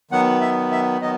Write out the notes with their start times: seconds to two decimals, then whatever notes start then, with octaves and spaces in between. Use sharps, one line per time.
0.11 D#3 F#3 B3 F#5
0.41 E5
0.72 E5
1.01 D#3 F#3 B3 D#5